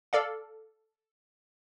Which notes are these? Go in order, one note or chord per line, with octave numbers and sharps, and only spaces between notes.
A4 D5 F5